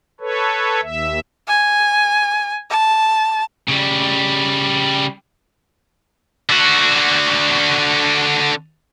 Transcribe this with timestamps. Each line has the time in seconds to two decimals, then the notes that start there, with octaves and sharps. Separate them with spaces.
0.20 A4 B4 C#5
0.82 D#2 E5
1.48 G#5
2.71 A5
3.69 C#3 G3
6.49 D3 F#4